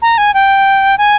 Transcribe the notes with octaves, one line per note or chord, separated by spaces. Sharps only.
A#5
G#5
G5
G#5